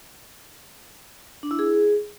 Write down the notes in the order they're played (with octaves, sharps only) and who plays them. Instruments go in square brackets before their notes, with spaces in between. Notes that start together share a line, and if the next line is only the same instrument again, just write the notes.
[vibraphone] D4
E4
G#4